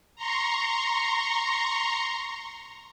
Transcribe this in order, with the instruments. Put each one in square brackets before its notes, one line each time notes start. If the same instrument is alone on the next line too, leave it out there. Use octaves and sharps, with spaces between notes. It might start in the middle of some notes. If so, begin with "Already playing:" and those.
[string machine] A#5 C6 C#6